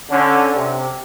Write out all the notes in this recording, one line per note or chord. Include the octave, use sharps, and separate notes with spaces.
D3 C#4
C3